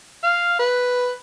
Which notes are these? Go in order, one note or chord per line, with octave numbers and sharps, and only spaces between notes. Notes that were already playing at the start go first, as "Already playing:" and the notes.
F5
B4